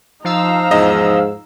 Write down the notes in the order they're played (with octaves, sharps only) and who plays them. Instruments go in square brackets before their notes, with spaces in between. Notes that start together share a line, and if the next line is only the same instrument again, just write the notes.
[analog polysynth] F3 F5 E6 [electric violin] D#4 A#5
[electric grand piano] E2 D#5 [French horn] G#2